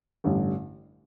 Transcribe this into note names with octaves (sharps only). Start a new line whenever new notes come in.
A1 G2 D3